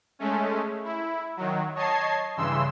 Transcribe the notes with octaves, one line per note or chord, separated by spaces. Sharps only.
G#3 A3 C#4
E4
D#3 F#3
C#5 D#5 A5 G#6 C7
G2 C#3 E3 C6 E6